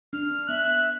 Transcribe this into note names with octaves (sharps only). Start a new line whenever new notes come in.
D4 F6
B3 E5 F#6